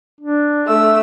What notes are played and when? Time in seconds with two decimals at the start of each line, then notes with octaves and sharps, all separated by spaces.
0.21 D4
0.66 A3 E6